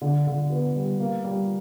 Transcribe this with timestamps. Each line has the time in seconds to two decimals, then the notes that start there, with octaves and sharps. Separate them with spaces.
0.01 D3
0.27 D3
0.50 B3
0.76 G3
1.00 A#3
1.24 G3